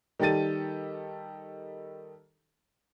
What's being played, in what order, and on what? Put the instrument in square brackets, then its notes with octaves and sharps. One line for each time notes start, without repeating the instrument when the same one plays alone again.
[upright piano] D#3 G3 G4 A4 A6 D#7